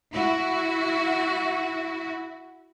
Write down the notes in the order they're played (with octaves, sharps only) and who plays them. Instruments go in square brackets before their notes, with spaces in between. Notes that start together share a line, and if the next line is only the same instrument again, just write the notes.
[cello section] E4 F#4